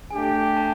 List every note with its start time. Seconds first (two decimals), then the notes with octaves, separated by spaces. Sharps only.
0.10 A3 D4 G4 G#5
0.57 A5